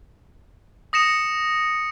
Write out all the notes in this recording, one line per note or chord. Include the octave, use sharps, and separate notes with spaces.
D#6 A#6 C#7 E7